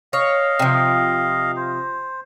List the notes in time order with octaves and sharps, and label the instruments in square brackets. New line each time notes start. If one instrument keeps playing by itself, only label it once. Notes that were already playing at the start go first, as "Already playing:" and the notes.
[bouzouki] C#5 [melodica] D#5 F5
[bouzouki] C3 F3
[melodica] C5